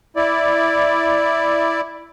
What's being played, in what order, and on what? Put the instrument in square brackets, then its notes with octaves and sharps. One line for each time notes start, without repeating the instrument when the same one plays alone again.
[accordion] E4 D5